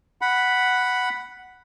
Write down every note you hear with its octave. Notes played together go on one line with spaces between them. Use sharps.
F#5 B5